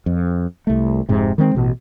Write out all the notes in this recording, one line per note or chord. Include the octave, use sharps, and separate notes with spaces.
F2
C2 A3
F1 G#2 C3
D#3 G#3 C4
A1 B2